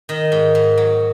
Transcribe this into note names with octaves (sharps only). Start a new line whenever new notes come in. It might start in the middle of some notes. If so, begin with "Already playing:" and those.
D#3 D#5
G#2
G#2
F#3